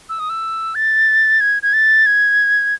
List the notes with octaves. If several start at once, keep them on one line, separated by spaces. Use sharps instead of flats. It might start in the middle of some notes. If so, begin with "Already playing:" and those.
E6
D#6
E6
A6
G#6
G#6
A6
G#6